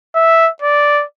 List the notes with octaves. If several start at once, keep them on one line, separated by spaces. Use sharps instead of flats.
E5
D5